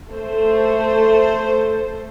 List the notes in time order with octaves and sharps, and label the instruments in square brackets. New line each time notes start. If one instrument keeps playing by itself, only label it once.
[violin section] A3 C5